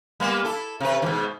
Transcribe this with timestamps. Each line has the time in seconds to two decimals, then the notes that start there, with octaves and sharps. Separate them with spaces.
0.20 G3 A#3 B3
0.45 E4 A4
0.80 C3 B4
1.02 G#2 B2 D#3